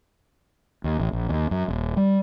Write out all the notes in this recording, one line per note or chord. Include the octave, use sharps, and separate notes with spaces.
D#2
A1
A#1
D#2
F#2
D#1
G3